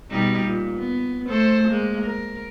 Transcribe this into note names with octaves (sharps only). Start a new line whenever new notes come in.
B2 G3 D#4
A#2
B3
A3 A4 C5
G#3 A#3
A#4